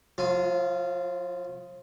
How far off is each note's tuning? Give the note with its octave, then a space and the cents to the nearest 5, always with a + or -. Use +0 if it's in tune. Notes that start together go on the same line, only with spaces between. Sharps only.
F3 +40 F4 -20